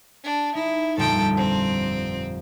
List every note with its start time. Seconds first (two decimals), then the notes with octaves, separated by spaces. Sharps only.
0.24 D4
0.55 D#4 E4
0.97 G1 F2 A#2 A4 G5
1.36 C4